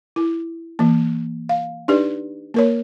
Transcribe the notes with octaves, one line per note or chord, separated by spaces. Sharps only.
E4
E3 A#3
F5
D4 D#4 G4 B4 D5
A#3 A#4 C#5